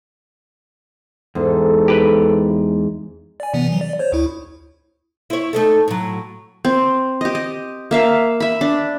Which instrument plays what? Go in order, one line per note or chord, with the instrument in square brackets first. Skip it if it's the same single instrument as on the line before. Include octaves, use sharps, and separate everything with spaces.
[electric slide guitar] E2 [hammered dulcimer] G#2 [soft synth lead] A4
[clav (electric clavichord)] G4 B4
[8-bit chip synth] D5 G#5
C3 E3 B3
E3 F#3
D5
C5 C#5
D2 E4
[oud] E4 C#5
A3 D#4 A4
A2 F#3
[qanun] C4
G4 D#5
D#5
A#3 E5 F5
E5 B5
D4